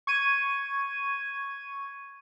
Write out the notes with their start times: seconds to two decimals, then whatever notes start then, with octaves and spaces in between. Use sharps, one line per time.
0.07 C#6 G#6 D#7